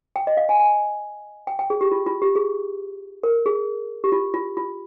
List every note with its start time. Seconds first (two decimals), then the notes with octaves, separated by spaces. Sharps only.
0.16 G5
0.27 D#5
0.37 F5
0.49 G#5
0.60 G#5
1.47 G5
1.59 G5
1.70 G#4
1.81 G4
1.92 F4
2.06 F4
2.22 G4
2.36 G#4
3.23 A#4
3.46 G#4
4.04 G4
4.12 F4
4.34 F4
4.57 F4